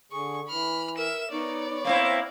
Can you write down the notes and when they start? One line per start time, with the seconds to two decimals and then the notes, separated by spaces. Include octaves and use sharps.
0.12 D3 G#4 C#6
0.49 E3 B5 F6
0.97 A#4 E5 E7
1.31 B3 D#4 C#5 D5
1.85 A#3 C4 E4 F5